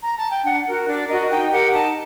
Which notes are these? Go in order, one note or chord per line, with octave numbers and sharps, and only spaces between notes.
A#5
A5
G5
D4 F#5
F#4 A#4
D4 D5
F#4 A#4 D#5
D#4 G5
G4 A#4 F#5
D#4 A5